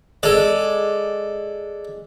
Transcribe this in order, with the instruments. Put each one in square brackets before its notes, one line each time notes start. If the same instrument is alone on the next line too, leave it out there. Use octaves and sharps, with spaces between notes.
[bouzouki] G#3 [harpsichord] A4 D5